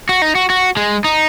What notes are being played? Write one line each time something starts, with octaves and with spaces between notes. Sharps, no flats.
F#4
D#4
F#4
F#4
G#3
D#4